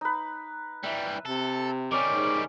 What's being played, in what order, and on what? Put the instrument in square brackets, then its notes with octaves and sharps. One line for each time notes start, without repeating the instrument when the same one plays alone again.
[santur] D#4 B4
[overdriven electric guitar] E3 G3 [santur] E5
[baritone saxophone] C3 [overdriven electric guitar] A4
[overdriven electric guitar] D#3 G3 [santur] C#4 C#5 [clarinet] D6
[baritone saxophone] G#2